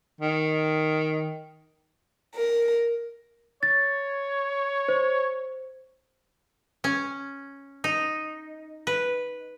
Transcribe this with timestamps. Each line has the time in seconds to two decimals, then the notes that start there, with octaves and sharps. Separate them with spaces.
0.21 D#3
2.34 A#4
3.63 C#5 A6
4.89 C5
6.84 C#4
7.84 D#4
8.87 B4